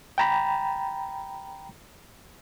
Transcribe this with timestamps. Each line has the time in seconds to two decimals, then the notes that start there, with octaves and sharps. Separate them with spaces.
0.18 G5 A#5 B5